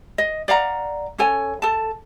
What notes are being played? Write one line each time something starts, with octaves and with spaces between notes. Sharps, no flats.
D#5
D5 F5 F#5 A#5
C#4 A4 C#5 G#5
A4 A5